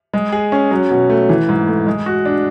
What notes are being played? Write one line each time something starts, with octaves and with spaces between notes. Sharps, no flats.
G#3
G#4
C#4
F#3
B2
A3
E3
G#2
A3
G#3
F#4
D4